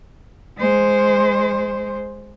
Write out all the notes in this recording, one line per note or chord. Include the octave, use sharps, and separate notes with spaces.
G#3 C5